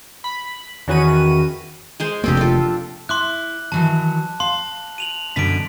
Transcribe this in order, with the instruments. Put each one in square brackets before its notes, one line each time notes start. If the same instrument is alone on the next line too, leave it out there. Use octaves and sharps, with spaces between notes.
[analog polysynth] B5
E2 D#3 C#4 F#4 B4 D#7
[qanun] G#3 G#4 C5
[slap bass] F1 A#3 [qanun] C4 D4 G4
[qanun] F4 A4
[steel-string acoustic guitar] E4 [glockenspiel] C6 D6 F#6
[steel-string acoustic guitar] D#3 E3 F#3 [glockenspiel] A5
[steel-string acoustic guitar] F5 [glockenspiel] C6
[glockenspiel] D#7 F7 F#7
[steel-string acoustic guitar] F#2 B2 D3 [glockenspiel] B6 D7